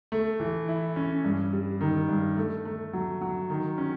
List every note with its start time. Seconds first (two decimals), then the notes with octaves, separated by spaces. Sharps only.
0.12 A3
0.40 E3
0.68 E4
0.96 C#4
1.24 G2
1.53 G3
1.81 D#3
2.09 G2
2.37 A3
2.65 A3
2.93 F#3
3.21 F#3
3.50 D#3
3.78 C#4